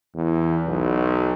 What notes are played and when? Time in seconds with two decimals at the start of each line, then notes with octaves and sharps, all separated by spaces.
0.15 E2
0.66 B1